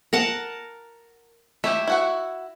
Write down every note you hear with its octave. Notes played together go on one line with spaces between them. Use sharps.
A#4 F#5 A5
A3 E4 G4 E5
E4 F#4 F#5